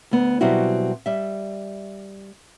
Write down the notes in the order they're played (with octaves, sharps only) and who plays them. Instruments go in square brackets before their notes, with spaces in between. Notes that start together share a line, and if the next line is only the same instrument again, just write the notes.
[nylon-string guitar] D2 B3
B2 F#3 G3 C4 E4 F#4
G3 E5